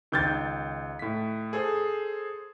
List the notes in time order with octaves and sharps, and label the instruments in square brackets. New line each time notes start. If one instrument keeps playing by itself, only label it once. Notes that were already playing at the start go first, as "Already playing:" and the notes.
[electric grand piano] C#2 [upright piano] D#3 G6 A6
[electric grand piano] A2 B6
G#4 A4 C5